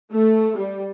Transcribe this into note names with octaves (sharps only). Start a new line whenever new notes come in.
A3
G3